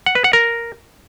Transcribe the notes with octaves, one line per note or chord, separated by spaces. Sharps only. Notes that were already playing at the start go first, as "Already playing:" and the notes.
F#5
B4
F#5
A#4